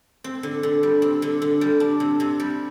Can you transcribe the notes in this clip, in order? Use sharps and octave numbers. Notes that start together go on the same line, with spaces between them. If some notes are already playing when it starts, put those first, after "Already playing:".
C4
D3
D3
G3
C4
D3
D3
G3
D4
C3
C3
G3